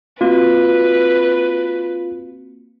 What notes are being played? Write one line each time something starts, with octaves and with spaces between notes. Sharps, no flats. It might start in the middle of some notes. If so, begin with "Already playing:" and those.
A#3 C4 F4 F#4 B4